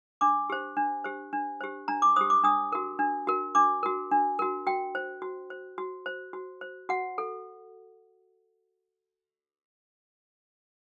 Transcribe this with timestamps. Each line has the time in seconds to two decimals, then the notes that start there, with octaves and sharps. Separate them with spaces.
0.21 D4 D6
0.50 G4 C5
0.77 D4
1.04 G4 C5
1.33 D4
1.60 G4 C5
1.88 D4 A#5
2.02 D6
2.16 G4 C5 D#6
2.30 D6
2.44 D4 D#6
2.72 F#4 A#4
2.99 D4
3.27 F#4 A#4
3.55 D4 D6
3.83 F#4 A#4
4.11 D4
4.39 F#4 A#4
4.67 F#4 G5
4.95 C5
5.22 F#4
5.50 C5
5.78 F#4
6.06 C5
6.33 F#4
6.61 C5
6.89 F#4 F#5
7.18 A4